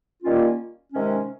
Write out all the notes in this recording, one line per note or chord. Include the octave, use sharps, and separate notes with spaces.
D#3 G3 A#3 C#4 F4
C3 D#3 G#3 C#4